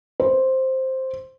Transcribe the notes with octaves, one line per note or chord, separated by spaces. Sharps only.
C5